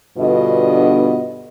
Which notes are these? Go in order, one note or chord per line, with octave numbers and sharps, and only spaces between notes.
G2 B2 D3 B3 F4 D#5